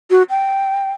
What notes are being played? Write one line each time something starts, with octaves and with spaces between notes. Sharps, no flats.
F#4
G5